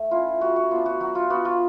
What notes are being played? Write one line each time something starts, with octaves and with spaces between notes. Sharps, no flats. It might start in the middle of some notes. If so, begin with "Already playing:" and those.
Already playing: A3
C#4 E4 F4
G3 F#4
F#4
B3 D4 F4
F#4
F#3 F#4
F4
B3 D4 F#4
F4